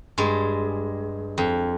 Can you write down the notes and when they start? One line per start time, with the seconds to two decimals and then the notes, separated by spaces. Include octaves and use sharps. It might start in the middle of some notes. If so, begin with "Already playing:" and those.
0.18 G2 G#3
1.38 F2